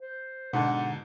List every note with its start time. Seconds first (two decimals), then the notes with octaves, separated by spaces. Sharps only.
0.01 C5
0.53 G#2 B2 D3 D#4 F#5 A5